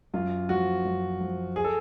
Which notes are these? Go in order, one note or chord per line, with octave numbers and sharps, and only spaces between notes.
F#2 F4
F3 F#4
F#2
F3
G#4
A4